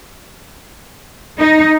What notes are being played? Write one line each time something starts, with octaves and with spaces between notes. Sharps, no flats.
D#4